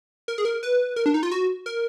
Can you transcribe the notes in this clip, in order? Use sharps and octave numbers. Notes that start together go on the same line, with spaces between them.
A#4
G#4
A#4
B4
A#4
D4
D#4
F4
F#4
A#4